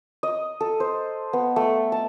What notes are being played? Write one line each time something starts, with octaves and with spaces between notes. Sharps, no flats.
D#5
A4
C5
B3
A3
A5